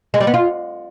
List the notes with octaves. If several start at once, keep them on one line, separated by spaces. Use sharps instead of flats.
G#3
G3
B3
F4